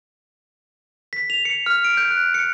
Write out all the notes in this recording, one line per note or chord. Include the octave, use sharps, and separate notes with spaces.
B6
F7
C#7
F6
D7
G6
F#6
C#7